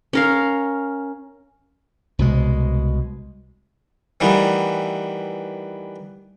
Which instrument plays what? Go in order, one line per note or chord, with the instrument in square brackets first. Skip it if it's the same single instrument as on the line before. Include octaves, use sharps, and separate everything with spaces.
[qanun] C#4 A#4 F5
[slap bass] C2 B2 G#3
[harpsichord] D#3 E3 G3 A3 B3